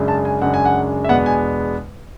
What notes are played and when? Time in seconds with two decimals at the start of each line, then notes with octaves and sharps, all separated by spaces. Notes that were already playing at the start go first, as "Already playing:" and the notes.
Already playing: F#2 C#3 G#3 D4
0.08 A5
0.25 G#5
0.42 F#2 C#3 G#3 D4 F#5
0.54 G#5
0.65 F#5
1.04 E5
1.09 E2 B2 G#3 B3 D4 F#5
1.26 G#5